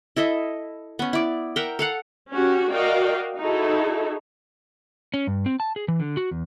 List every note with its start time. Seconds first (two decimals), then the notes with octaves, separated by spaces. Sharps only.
0.16 E4 A4 D#5 E5
0.99 B3 C#4
1.13 E4 D5
1.56 A#4 E5 F#5 G5
1.79 A4 F5 F#5
2.32 C#4 F#4 G4
2.72 F#4 A#4 D5 D#5 F5 G5
3.40 D#4 E4 F#4 G#4 A4
5.14 C#4
5.27 G2
5.46 C4
5.60 A5
5.76 G#4
5.88 E3
6.00 D3
6.17 F#4
6.31 E2